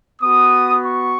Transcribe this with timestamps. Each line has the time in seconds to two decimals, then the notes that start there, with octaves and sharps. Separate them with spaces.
0.21 B3 F#4 D#6
0.84 C#6